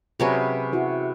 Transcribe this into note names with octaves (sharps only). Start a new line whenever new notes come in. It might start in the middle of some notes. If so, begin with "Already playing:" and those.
C3 F#3 C#4 G#4 B4
E4 F#4 B4